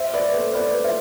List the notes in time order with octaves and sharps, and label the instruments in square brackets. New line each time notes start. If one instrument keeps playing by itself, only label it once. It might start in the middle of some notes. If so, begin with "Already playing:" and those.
Already playing: [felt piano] C5 E5
B4 D5
A4 C5
B4 D5
C5 E5